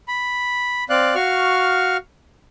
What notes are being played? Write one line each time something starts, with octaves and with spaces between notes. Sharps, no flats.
B5
C4 D5 F5 F#6
F#4 F5 C#6 F6